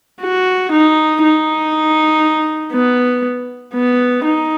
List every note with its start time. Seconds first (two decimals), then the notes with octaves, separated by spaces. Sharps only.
0.22 F#4
0.72 D#4
1.23 D#4
2.73 B3
3.74 B3
4.24 D#4